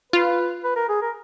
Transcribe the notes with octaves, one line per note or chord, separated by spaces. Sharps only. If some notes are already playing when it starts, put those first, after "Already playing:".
F4 B4
B4
A#4
G#4
A#4